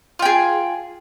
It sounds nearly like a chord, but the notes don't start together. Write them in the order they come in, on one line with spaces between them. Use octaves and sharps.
F4 G5 G#4